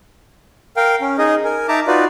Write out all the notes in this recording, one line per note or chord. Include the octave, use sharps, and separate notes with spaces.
A#4 F5 G5
C#4
D#4 G#4 D#5
A#4 G#5
D#4 E5 A5 A#5 D6
D#4 F4 F#4 B4 D5